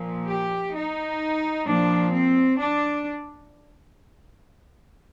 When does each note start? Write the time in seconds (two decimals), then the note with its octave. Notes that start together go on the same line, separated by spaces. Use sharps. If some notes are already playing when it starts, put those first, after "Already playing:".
Already playing: A#2 F3
0.27 G4
0.74 D#4
1.66 A#2 F3 D4
2.13 C4
2.59 D4